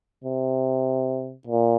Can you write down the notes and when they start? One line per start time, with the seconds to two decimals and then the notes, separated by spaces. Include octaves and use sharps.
0.24 C3
1.47 A#2